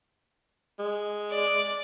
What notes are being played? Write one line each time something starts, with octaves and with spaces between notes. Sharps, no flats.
G#3
D5